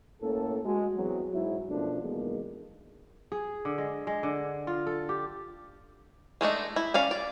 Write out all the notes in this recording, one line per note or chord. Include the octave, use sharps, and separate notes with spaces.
A2 A#3 C#4 A4
G#3 F#4
E2 F#3 C4 F#4 G#4
G#2 F#3 E4
F#2 B2 F3 A3 D4
B1 E2 D#3 G#3 A#3
G#4
D3
G#3
G#3
D3
F4
A4
G4
G#3 A3 D4 D#4
E4
C#4 D5 F5
D5